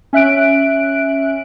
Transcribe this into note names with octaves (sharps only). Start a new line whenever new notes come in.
C#4 E5 F#6 D7